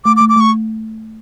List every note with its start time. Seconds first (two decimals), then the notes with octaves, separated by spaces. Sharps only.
0.05 A3 D6
0.16 D6
0.21 A3
0.29 D6
0.36 A3 C#6